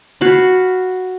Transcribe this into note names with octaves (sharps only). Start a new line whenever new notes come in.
F#4 F5 B5